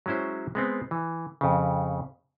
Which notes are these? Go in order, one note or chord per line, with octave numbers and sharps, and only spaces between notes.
F#3 G#3 C#4 E4 C5
G#3 B3 C4
E3
F2 C#3